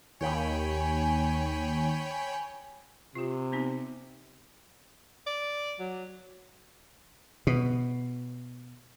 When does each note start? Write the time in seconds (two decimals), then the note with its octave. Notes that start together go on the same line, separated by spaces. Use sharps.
0.21 D#2 C#5 G5 G#5 B5
3.15 C3 F4 G4
3.52 B3 C4 D#4
5.27 D5
5.79 F#3
7.47 B2